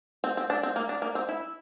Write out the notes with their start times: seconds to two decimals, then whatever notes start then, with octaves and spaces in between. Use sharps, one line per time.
0.24 C4
0.37 C4
0.50 D4
0.63 C4
0.76 A#3
0.89 D4
1.02 A#3
1.15 C4
1.29 E4